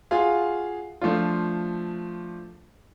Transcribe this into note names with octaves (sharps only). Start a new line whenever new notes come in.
F4 F#4 G#4 F5
F3 A3 D4 F4